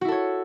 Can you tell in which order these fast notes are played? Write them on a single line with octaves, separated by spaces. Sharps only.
F#4 E4 A4 C#5